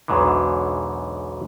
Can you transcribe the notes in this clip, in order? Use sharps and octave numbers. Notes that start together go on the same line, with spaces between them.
B1 E2 G#2 B2 D3